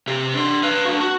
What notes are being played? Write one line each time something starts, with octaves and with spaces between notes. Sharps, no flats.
C3 G4
D4 C6
B4 F5
D4 F#4
F#4